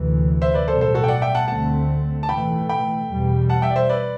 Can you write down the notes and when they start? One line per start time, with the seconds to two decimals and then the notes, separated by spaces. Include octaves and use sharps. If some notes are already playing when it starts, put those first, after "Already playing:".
Already playing: D2 C3 E3
0.42 C5 E5
0.54 B4 D5
0.68 B1 A2 G3 B3 A4 C5
0.81 A4 C5
0.94 F#4 A4
1.04 G5
1.08 D5 F#5
1.21 E5 G5
1.35 F#5 A5
1.48 D2 D3 A3 C4 F#5 A5
2.23 A5
2.28 B1 A2 E3 A3 G5 B5
2.69 G5 B5
3.09 E2 B2 G3
3.49 F#5 A5
3.62 E5 G5
3.71 D5
3.76 C5 E5
3.89 B4 D5